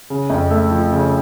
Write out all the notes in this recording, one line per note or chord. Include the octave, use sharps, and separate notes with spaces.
C#3
F2
A3
F3
C#3